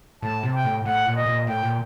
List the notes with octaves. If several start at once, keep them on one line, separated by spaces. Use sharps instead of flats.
A2 A5
C3
G5
A2
A2 F#5
A#2
D#5
A#2
A2 G5
A#2